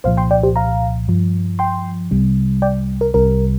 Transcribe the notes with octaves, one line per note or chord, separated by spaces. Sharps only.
C2 A#2 F3 C5 F5
G5 C6
D5 G5
G4 C5
F5 A#5
G2 F3
G5 C6
C2 C3 G3
D5 G5
A#4
C2 C3 G3 A#4